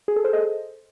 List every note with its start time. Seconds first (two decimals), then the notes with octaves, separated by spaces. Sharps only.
0.08 G#4
0.16 A4
0.24 C5
0.33 D#5